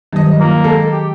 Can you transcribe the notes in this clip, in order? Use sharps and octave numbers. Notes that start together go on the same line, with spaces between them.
G2 D#3 F#3 D#5
A#3 F4
G#3 A4
G4